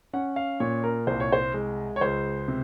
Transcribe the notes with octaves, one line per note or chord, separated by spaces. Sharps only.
C#4 F#5
F5
A#2 C#5
A#4
C2 C5
C#5
C5
G#3
C#5
C#2 C5
C3